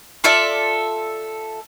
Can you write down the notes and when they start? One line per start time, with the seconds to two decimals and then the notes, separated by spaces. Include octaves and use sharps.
0.24 F4 A4 D5 E5